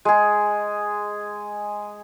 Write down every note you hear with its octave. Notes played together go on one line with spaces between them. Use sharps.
G#3 G#4